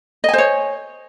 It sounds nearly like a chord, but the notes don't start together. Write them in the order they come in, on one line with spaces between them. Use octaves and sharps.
D#5 G#5 C5 C#5